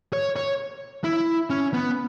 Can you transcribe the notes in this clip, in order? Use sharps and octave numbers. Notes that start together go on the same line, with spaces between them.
C#5
C#5
E4
C#4
B3